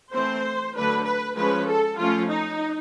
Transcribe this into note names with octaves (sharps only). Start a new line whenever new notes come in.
E3 A3 C4 C5
D3 F#3 A3 D4 B4
B4
F3 G#3 C#4 B4
A4
F3 A3 C#4 F4
D#4